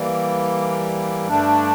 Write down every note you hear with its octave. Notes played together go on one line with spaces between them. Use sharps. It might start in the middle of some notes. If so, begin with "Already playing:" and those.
Already playing: E3 G3 A#3
G2 D3 A3 D4